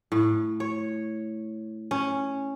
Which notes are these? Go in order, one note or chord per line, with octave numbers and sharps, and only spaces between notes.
A2
C#5
C#4